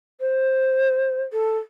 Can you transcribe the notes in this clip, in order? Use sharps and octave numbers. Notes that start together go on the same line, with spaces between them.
C5
A4